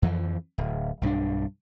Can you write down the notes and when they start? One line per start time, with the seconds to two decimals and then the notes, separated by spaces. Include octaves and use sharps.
0.02 F2 E3 F3
0.58 D1
1.01 B1 G2 F#3 D4